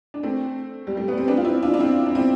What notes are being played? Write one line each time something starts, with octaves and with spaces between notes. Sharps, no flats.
D4
A3 C4
G3
A3
B3
C4
B3 D4
F4
C4 E4
D4 F4
D4
C4 E4
D4
C4 E4